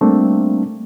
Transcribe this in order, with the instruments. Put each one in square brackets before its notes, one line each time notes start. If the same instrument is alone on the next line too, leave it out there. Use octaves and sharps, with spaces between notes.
[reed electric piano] G3 A3 A#3 C4 D4